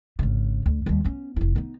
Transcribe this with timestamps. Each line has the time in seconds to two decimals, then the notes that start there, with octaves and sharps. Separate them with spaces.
0.19 G#1 C#3
0.66 D2
0.86 D#2 G3
1.04 B3 C#4
1.36 F1 E4
1.56 B3 D#4